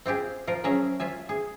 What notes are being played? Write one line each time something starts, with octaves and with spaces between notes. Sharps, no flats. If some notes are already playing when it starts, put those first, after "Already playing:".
C4 F4 G4 G#4
F3 F4 A#4
F#3 C#4 G#4 E5 A#5
F4 E5 G#5
G#4